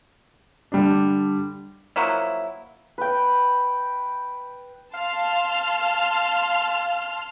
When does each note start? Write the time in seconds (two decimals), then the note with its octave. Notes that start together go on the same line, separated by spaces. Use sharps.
0.72 D3 G3 D4
1.96 F3 F#3 A#3 E4
2.98 B4 G5
4.94 F5 A5 C6 F6